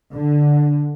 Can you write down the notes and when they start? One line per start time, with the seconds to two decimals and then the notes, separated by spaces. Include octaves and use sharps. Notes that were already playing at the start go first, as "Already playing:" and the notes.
0.14 D3